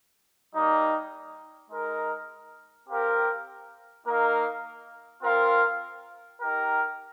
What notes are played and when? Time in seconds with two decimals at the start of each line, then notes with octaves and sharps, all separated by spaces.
0.53 G3 A#3 D#4
1.70 G#3 D#4 A#4
2.87 C4 G4 A#4 F5
4.05 A#3 D#4 A#4 F5
5.21 C4 F4 A#4 F5
6.39 D#4 G4 A#4